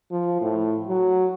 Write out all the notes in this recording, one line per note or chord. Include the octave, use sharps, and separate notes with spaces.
F3
A2
F#3